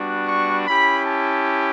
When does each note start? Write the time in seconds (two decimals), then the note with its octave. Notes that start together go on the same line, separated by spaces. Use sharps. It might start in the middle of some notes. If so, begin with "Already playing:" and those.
Already playing: G3 B3 D4 F#4
0.27 C#6
0.66 C#4 E4 G4 B5
1.04 A5